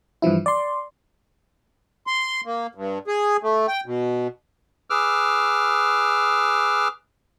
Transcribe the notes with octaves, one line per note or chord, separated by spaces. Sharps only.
G2 E3 F3 E4
D5 C6
C6
A#3
G2
G#4
A3
G5
B2
G#4 B4 D6 E6 F6